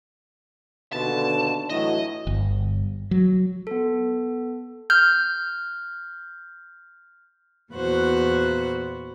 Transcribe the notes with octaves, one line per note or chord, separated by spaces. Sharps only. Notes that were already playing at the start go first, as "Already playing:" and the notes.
D#2 B2 D3 A5
A2 E3 F#3 D#5
G1
F#3
B3 A4
F6 G6
E2 A#2 F#4 B4 C5 F#6